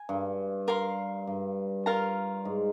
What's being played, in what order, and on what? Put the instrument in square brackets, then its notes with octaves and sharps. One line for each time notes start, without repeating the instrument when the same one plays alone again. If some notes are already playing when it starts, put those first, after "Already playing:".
Already playing: [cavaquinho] G#5
[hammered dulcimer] G2
[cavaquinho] A#4 F5 C6
[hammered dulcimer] G2
[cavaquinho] F4 A#4 F5 A#5
[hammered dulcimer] G#2